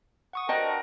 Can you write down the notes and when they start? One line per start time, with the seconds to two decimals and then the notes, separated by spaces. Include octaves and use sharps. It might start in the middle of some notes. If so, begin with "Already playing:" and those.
0.33 F#5 C#6 D#6
0.49 G2 F#4 A#4 C5 D#5 G5 A5